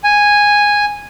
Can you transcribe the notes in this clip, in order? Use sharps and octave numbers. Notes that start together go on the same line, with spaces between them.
G#5